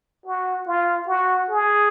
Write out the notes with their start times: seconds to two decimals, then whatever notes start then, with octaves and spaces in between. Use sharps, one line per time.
0.26 F#4
0.67 F4
1.07 F#4
1.50 G#4